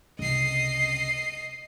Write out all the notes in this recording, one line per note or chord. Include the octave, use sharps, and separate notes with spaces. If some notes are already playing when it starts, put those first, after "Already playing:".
C2 C#3 D#5 C7